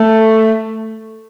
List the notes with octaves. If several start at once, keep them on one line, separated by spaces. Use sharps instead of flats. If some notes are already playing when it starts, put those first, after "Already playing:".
Already playing: A3